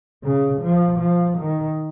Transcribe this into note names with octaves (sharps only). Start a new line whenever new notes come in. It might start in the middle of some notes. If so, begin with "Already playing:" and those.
C#3
F3
F3
D#3